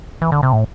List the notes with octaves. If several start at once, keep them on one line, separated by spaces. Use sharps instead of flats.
E3
D3
C3
A2